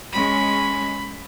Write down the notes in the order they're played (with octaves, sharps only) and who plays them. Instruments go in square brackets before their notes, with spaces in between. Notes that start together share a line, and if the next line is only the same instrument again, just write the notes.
[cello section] G#3 C#4 [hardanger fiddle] B5